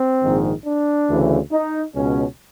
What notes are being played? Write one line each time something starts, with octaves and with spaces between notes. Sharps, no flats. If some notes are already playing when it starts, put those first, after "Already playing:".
Already playing: C4
A#1 G#2 D#3
D4
D2 C#3 E3
D#4
C#2 B2 C#4